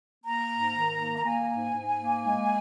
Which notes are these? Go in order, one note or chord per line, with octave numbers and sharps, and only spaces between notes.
A#3 A#5
G#2
D#3
A#3
A#5
A#3 G#5
G#2
G#2
A#3
G#3